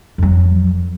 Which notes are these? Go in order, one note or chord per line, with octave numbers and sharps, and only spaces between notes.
F2 F#3